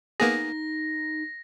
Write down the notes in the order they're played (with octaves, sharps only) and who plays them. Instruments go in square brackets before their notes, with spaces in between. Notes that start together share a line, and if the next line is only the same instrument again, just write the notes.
[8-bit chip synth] A#3 B3 G#4 [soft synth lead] D#4 [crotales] A#6